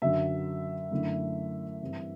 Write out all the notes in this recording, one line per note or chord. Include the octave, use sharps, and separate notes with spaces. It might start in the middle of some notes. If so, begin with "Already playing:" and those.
F#2 D3 F#3 E5
F#2 D3 A3 E4
G2 E3 G3 C4 E4